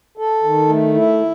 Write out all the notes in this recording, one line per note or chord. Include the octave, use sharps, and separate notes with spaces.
A4
D#3
A3
E4